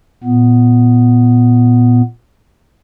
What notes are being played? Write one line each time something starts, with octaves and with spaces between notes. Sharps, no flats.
A#2 B3